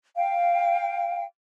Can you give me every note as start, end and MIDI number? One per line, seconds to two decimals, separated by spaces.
0.15 1.24 77
0.15 1.24 79